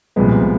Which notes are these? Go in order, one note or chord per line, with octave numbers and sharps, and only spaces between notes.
C2 A#2 F3 G#3 B3